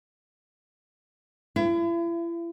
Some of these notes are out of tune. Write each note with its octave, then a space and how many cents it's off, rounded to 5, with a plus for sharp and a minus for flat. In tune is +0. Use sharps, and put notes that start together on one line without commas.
E4 +40 E5 +40